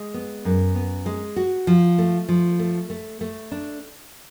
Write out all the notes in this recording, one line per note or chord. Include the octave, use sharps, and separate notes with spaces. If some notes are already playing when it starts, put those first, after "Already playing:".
Already playing: G#3
B3
F#2
B3
G#3
F#4
F3
A3
F3
A3
A3
A3
D4